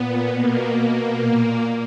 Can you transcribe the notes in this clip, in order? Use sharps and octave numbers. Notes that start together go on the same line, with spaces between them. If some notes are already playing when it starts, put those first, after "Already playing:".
Already playing: A#2 B3
B2 A#3
B2
A#2